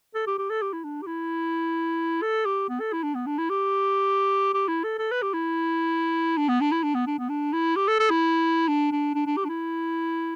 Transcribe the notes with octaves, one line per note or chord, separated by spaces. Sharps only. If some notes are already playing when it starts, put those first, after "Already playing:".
A4
G4
G4
A4
G4
E4
D4
G4
E4
A4
G4
B3
A4
E4
D4
B3
D4
E4
G4
G4
E4
A4
A4
B4
G4
E4
D4
B3
D4
E4
D4
B3
D4
B3
D4
E4
G4
A4
A4
E4
D4
D4
D4
D4
G4
D4
E4